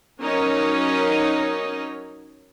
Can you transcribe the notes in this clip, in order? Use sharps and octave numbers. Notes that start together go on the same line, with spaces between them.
F#3 C#4 D#4 A#4 C#5 D#5